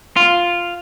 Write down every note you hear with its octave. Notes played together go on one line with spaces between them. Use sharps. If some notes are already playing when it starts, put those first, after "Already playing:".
F4